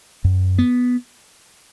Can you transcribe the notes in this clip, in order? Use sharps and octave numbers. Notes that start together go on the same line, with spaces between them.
F#2
B3